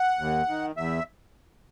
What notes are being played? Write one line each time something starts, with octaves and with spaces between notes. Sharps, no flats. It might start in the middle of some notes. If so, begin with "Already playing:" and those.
Already playing: F#5
D#2
D#3
E2 E5